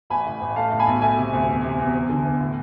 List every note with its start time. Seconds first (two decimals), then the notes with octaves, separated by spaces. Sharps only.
0.10 A1 G#5 B5
0.26 A2
0.41 A1
0.56 A3 F5 A5
0.72 A2
0.79 G#5 B5
0.87 B1
1.02 A3 E5 G#5
1.17 C3
1.33 D2
1.49 E2
1.63 C3
1.79 E2
1.94 E2
2.09 D3
2.25 E2
2.41 A2